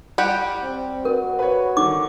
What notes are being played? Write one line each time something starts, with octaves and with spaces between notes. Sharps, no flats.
G3 G4 F#5
C4
F#4 A#4
B4 C#5
D3 D#3 D6